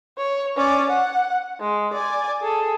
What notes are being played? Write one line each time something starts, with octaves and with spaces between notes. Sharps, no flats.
C#5
C#4 D5
F#5
G#3
D5 G#5
G#4 A4